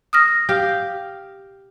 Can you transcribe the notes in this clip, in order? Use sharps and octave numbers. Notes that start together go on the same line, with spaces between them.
D#6 F6 A#6
G4 F5